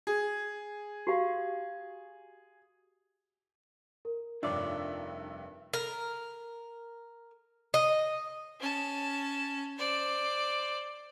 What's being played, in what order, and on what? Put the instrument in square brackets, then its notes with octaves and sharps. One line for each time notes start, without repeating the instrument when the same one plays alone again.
[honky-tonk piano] G#4
[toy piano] F#4 G4 F5
[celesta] A#4
[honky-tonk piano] F1 G2 E5 [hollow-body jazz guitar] D4 D#4 [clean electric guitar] F4 C#5 D5
[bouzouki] A#4
D#5
[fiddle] C#4 A5
C5 D5